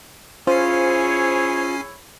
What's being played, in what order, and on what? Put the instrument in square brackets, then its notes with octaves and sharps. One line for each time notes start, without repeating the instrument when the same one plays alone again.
[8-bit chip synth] C#4 G#5 C7 [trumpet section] E4 G#4 C#5 [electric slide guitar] F4 [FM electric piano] C5